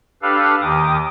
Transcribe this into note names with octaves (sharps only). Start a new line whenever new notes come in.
D4 G4 A4 B4 F5
D#2 D#3 G4 D6 D#6